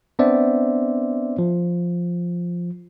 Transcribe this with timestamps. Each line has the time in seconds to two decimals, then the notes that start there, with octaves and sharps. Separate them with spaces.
0.19 B3 C4 D4 C5 D5 E5
1.39 F3